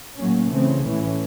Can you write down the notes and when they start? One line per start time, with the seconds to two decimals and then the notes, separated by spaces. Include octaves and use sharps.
0.18 A2 F#3 A#3 C#4
0.51 C#3 E3 A3 C4
0.85 A2 E3 A3 C#4